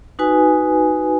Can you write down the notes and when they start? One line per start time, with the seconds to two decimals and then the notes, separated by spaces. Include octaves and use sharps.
0.19 D#4 F#4 B4 G#5